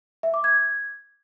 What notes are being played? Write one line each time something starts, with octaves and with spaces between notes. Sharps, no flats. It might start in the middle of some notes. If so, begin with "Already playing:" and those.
E5
D6
G#6